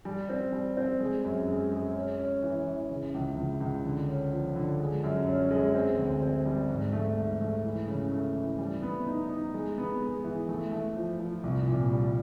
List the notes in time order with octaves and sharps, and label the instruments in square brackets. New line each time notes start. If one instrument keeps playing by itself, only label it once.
[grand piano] G3
C4
G3
C4
G#3
F#2
G#3
G#3
C#4
C#4
E3
E3
C#3
C#2
C#2
C#2
D3
C#4
F3
D3
G#3
F#2
C#4
G#3
C4
D2
C4
G3
G#2
A3
G#2
A3
E3
C#3
A3
E3
G3
B3
D#4
D#4
G#3
B3
G#3
E3
A3
A3
F3
F3
C2
A#2
G3